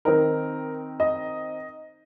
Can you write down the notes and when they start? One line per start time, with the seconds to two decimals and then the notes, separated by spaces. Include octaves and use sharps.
0.05 D#3 C4 D#4 A#4
1.00 D#5